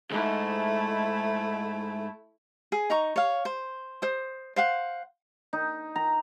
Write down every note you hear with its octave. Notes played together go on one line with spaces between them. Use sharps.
C#2 G#2 A3 E4
G#4
D#4 A#5 C#6
C#5 F5
C5
C5 D#6
C5 F5 F#5
D#4
A#5